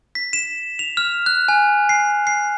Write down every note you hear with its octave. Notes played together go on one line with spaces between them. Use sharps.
B6
E7
F7
F6
F#6
G#5
C7
C7